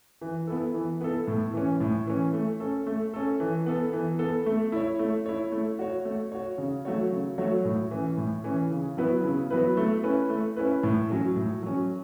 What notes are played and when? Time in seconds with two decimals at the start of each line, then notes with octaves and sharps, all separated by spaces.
0.21 E3
0.47 B3 E4 A4
0.74 E3
1.01 B3 E4 A4
1.27 A2
1.54 E3 C#4
1.80 A2
2.07 E3 C#4
2.33 A3
2.60 C#4 A4
2.87 A3
3.14 C#4 A4
3.40 E3
3.66 B3 A4
3.93 E3
4.19 B3 A4
4.46 A3
4.72 E4 C#5
4.99 A3
5.26 E4 C#5
5.52 A3
5.79 F#4 C#5
6.05 A3
6.32 F#4 C#5
6.58 C#3
6.85 F#3 A3 F#4 C#5
7.12 C#3
7.38 F#3 A3 F#4 C#5
7.65 A2
7.91 E3 C#4
8.18 A2
8.44 E3 C#4
8.71 C#3
8.97 F#3 B3 E4 B4
9.24 C#3
9.50 F#3 B3 E4 B4
9.77 A3
10.03 C#4 E4 B4
10.30 A3
10.56 C#4 E4 B4
10.83 A2
11.10 F#3 C#4
11.36 A2
11.63 F#3 C#4